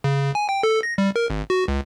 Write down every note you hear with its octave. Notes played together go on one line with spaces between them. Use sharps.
C#3
G#5
G5
A4
A#6
G3
A#4
G#1
F#4
C#2